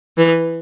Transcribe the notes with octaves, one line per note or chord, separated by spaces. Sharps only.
E3